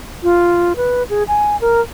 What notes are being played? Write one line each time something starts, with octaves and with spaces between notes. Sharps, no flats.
F4
B4
G#4
G#5
A#4